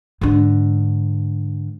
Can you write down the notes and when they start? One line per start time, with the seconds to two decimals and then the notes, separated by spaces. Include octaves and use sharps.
0.21 G#2 D3